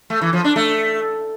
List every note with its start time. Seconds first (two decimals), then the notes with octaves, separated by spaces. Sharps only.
0.10 A3
0.21 E3
0.33 F3
0.44 D4
0.56 A3